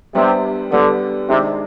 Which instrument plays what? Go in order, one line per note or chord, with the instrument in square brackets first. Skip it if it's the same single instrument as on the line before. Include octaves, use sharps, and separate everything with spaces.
[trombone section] C3 [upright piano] G3 B3 D4
[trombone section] D3 [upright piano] G3 B3 D4
[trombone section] C3 [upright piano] D#3 G#3 D4